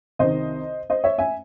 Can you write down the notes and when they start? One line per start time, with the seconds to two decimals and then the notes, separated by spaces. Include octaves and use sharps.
0.19 C2 C3 D#3 C5 D#5
0.90 C5 D#5
1.04 C#5 E5
1.18 E5 G#5